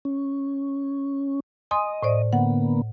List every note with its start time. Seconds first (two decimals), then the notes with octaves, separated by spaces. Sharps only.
0.05 C#4
1.71 D#5 G#5 C6 D#6
2.03 A2 C5 D5
2.33 D3 A#3 B3 F#5